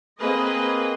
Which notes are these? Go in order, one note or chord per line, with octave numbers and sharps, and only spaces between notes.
A#3 C4 G#4 B4 D#5